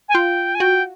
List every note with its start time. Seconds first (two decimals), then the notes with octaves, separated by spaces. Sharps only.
0.09 G#5
0.14 F4 G5
0.55 G#5
0.60 F#4 G5